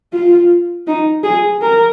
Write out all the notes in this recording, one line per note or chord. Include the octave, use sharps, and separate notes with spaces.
F4
D#4
G#4
A#4